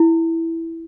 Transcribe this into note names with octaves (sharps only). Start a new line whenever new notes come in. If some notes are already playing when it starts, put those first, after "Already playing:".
Already playing: E4